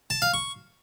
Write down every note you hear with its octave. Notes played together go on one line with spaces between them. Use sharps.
A5
F5
C#6